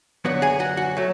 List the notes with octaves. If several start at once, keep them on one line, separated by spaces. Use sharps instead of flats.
F#2 D3 F#3 B3 F#4 F#5
G#4 G#5
F#4 F#5
F#4 F#5
F#3 A3